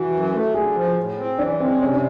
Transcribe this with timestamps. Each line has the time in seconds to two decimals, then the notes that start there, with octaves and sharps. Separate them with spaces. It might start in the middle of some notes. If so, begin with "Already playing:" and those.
Already playing: E3 F#4
0.12 F#2
0.33 A3
0.54 D3 G#4
0.75 F3
0.97 A2
1.18 C4
1.38 E3 D4
1.60 G#3 C4
1.81 C3 C#4
1.94 D4